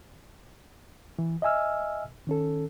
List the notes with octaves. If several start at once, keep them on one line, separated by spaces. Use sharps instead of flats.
E3
D#5 E5 G#5 E6 F6
D#3 C#4 A4